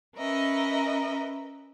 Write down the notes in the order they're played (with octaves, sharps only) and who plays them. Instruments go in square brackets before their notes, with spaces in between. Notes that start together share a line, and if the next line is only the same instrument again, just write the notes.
[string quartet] C#4 A#4 B4 D#5 E5